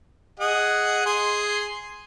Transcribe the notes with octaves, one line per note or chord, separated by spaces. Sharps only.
G#4 D#5 F#5
G#4 C6